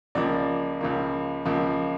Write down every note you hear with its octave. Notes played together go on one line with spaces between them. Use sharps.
C#2 C#3 F3 A#3 D5
C#2 C#3 F3 A#3
C#2 C#3 F3 A#3